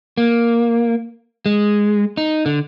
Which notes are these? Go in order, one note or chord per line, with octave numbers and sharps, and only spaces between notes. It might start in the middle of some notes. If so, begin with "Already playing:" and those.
A#3
G#3
D#4
D3